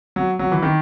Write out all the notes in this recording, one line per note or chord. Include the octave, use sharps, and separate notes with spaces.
F#3
F#3
E3
D#3